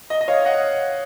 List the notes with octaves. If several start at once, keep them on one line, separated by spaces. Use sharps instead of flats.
D#5
D#5
C#5 F5
D#5 F#5